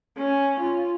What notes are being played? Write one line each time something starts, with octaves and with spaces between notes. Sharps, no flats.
C#4
F4